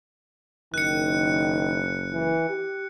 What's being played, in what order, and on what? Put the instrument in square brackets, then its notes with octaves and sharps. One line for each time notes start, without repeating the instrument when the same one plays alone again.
[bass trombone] F#1 [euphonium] D#3 [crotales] F#6 C#7
[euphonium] E3
G4